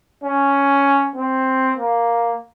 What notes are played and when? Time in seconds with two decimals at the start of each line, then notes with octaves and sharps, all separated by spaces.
0.24 C#4
1.16 C4
1.77 A#3